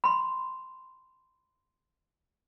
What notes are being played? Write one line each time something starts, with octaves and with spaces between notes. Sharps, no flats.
B5 C6